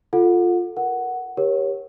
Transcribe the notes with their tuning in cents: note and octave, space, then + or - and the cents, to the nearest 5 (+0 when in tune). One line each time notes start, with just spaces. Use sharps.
F4 +5 A4 +0 F#5 -30
A#4 +20 F#5 +0
G4 +0 A#4 +25 C#5 -10